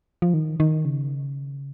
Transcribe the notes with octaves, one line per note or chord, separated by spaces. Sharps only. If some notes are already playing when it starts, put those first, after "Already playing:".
F3
D#3
D#3
C#3